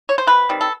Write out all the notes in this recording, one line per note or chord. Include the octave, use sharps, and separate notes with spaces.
C#5
C5
C3 B4
D#3 G3 C4
A4